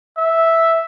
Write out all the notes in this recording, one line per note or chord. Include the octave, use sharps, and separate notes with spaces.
E5